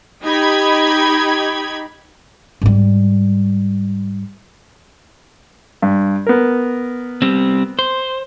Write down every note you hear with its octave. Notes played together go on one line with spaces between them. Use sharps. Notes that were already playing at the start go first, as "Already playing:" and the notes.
D#4 G4 B5 G#6
G#2 G3
G2
B3 A#4
G3 C4
C5